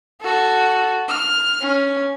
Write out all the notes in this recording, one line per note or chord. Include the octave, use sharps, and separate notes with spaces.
F#4 A4
F6
C#4